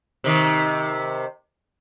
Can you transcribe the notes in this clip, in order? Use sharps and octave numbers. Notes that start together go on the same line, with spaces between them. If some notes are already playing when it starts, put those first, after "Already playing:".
C3 D#3